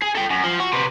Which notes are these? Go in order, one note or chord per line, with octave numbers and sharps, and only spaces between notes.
G#4
A4 G5
F#2
F3
F#4
C3 B3